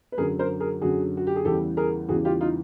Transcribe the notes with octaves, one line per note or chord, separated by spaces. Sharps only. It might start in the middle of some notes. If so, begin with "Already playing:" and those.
B4
F#2 D3 F#3 G#4 A#4
A#4 C5
G#4 A#4
F#2 D3 F#3 F#4 G#4
F#4
G4
G#4
E2 C#3 E3 G3 G4 A4
G#4 A#4
E2 C#3 E3 G3 F#4 G#4
F4 G4
D#4 F4